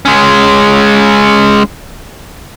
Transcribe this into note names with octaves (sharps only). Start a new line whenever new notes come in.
G#3 C#4